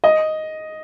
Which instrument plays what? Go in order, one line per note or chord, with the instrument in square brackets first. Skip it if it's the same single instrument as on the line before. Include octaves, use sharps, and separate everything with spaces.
[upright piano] D#5